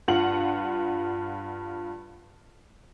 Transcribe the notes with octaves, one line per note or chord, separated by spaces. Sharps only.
G2 F4 F#5 F#7